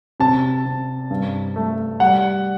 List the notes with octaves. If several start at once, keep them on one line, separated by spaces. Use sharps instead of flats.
C3 A5
C3
G2
A3
G3 F#5